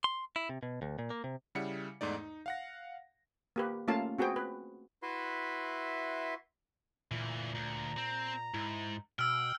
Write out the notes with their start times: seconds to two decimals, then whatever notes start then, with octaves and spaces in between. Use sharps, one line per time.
0.04 C6
0.36 E4
0.49 C3
0.63 B2
0.82 D2
0.99 A#2
1.10 A#3
1.24 C3
1.55 C#3 G3 E4 F#5 C#7
2.01 E2 G#2 A3 D#4 D5
2.17 D#4
2.46 F5 F#5 A#6
3.56 A#3 G4 B4
3.88 A3 A#3 C#4 F4 F5 A5
4.19 C4 F#4 G#4 B4 G5
4.36 B4
5.03 E4 F#4 B4 E5 C6
7.11 D2 A#2 E3
7.55 D2 A#5
7.97 C4
8.54 G#2 E4
9.19 B2 G5 E6 F6